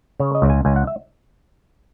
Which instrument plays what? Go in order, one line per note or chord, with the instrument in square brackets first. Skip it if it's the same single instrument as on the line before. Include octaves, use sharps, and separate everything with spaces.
[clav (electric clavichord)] C#3 C#5
D#5
C#2
G#5
C#2 G#5
F#5
E5